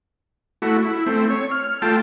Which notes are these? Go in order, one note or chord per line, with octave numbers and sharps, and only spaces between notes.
A3 E4 F#4
E4
A3 C4
C#5
F6
A3 F4 G5 A5